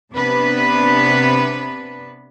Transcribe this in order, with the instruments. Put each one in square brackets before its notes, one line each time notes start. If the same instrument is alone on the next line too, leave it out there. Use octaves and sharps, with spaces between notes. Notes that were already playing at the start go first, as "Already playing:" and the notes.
[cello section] C3 B3 D4 B4